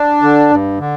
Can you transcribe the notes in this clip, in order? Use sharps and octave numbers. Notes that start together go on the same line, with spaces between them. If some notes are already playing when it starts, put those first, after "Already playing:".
Already playing: D4
D3
G2
D3